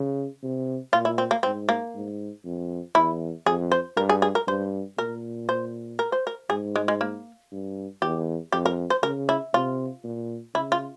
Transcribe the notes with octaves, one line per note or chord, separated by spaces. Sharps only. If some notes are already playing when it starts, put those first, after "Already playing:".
Already playing: C#3
C3
A#2 F4
E4
C4
A#3
G#2 C4
A#3
G#2
F2
E2 E4
F2 G#4
C5
G2 A#4
G#4
G#4
A#4
G2 C5
A#2 A#4
C5
A#4
C5
A#4
G#2 G#4
G#3
G#3
A#3
G2
E2 G4
F2 G4
A#4
C5
C#3 A#4
E4
C3 F4
A#2
C#3 E4
F4